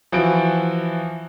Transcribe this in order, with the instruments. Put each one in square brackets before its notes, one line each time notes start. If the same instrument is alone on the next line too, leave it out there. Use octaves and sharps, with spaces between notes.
[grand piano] E3 F3 F#4 D7